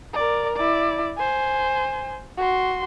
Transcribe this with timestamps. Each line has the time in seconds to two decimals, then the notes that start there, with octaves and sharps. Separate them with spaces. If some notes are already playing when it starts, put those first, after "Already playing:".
0.14 A#4 D5
0.56 E4 D5
1.17 C5 G#5
2.38 F#4 C6